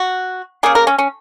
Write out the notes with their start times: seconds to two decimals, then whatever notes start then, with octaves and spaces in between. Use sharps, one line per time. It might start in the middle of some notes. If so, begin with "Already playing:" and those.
Already playing: F#4
0.63 C#3 A#3 G#4
0.75 A#4
0.87 C#4
0.98 C#4